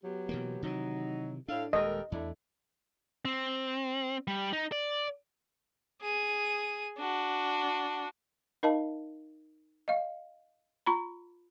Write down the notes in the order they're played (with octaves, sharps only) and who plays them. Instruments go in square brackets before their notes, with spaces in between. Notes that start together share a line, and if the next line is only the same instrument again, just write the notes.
[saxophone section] F#3 B3 G4
[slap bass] B2 E3 A#3
[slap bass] C3 D#3 E3 [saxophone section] F#3 D#4
[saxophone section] A2 A4 F5 [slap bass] D4
[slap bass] D#1 G#3 [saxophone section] G4 A4 A#4 [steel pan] D#5
[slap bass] E2 [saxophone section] A3 D4 E4
[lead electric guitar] C4
G3
D#4
D5
[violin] G#4 D#7
D4 F#4
[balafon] D#4 A#4 D#5 F5 A5
D#5 F5
F4 A#5 B5